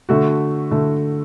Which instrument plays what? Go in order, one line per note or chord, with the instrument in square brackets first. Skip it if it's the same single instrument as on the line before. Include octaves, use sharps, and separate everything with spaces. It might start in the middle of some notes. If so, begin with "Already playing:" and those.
[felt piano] D3 A3 F#4
D3 A3